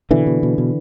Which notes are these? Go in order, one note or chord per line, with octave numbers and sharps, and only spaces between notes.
B2 D3 E3
B2
B2
B2